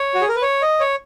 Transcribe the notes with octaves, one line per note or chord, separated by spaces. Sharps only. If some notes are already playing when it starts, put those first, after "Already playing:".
Already playing: C#5
F#4
G#4
A#4
B4
C#5
D#5
C#5